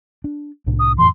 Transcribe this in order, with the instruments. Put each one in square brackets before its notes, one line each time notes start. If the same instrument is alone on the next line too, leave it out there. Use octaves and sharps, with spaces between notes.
[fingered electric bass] D4
C2 A2 D4
[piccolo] D#6
[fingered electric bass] F2 A2 E3 [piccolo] C6